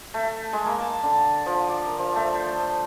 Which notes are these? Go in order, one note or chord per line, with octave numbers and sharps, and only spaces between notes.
A3
G#3
A#3
A5
D3
F3
D5
A#4
F3
A3
C5